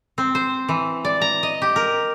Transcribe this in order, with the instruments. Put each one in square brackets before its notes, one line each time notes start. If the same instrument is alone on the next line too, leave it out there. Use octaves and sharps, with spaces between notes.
[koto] C4
C5
E3
D5
A#5
D#5
G4
A#4